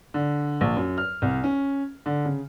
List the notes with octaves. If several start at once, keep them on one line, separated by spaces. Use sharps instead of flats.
D3
A#1
F#2
F6
C2
C#4
D3
C#3